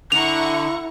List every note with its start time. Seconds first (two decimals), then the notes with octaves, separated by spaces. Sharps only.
0.12 D3 E4 F#5 A#5 C#6 F7